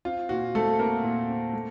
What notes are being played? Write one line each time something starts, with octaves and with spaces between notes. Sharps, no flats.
C4 F4
A#2 F#4
A3 C4 A4
A#3 C4 A#4
A#2
C4
A3